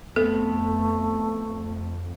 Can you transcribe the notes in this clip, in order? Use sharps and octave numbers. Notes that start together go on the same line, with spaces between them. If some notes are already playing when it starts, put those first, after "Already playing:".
F2 A3 B3 C4 A4